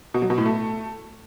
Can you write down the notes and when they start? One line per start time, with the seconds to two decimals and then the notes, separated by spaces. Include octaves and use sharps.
0.14 B2
0.22 F#3
0.30 B2
0.38 A2
0.46 A3